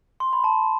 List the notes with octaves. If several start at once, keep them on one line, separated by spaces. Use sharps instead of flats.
C6
B5
A5